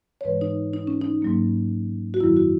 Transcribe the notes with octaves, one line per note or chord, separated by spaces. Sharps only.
C#5
G#2 E3 G#3 B4
D#4
D#4
C#4
D#4
G#2 F#3 A#3
F#4
F#2 D#3 F#3 E4
F#4